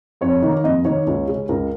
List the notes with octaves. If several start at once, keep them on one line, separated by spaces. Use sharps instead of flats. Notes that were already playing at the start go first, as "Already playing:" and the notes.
F2 C#5
D#3 A#3
F2 D#5
D#3 A#3 C#5
C#2
C#3 G#3 C#4
C#2 A#4